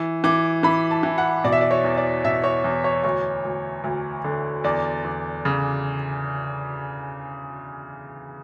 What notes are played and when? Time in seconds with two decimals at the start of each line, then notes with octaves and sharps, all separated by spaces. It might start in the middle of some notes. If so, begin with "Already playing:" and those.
Already playing: E3
0.24 E3 D6
0.63 E3 B5
0.91 A5
1.03 E3
1.18 F#5
1.44 B2 D5
1.52 E5
1.61 D5
1.71 C#5
1.84 E2
1.97 D5
2.24 B2 E5
2.44 C#5
2.64 E2
2.84 C#5
3.04 D2 C#5
3.45 D2
3.84 D2
4.24 D3
4.64 E2 D5
5.04 E2
5.45 C#3